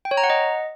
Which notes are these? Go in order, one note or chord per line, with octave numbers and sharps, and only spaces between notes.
G5
C#5
A#5
F#5
D#5